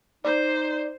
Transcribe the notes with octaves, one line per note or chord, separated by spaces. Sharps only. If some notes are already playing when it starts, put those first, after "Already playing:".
D#4 C5 D5